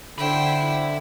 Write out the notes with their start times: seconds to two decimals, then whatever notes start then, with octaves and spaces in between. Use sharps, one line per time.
0.18 D3 C5 E5 G5 B5